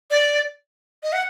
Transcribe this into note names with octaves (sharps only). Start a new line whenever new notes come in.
D5
D#5
F#5